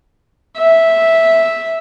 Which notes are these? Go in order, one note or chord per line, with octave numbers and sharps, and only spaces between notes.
E5